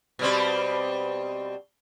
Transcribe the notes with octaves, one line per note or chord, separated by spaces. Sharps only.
B2 G3 C4